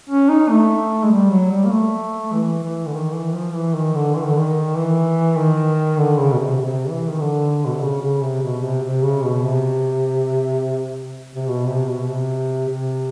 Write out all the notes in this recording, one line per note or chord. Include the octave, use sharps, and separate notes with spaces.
C#4
D#4
A3
G#3
G3
F#3
G3
A#3
A3
E3
E3
D3
D#3
E3
F3
E3
D#3
D3
E3
D#3
D3
D#3
E3
D#3
D3
C#3
B2
C3
C3
E3
D#3
D3
B2
C3
C#3
C#3
C3
B2
C3
C3
C#3
B2
C3
C3
B2
C3
B2
C3
C3